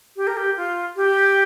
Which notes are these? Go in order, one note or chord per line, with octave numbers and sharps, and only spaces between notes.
G4
A#4
G4
F4
G4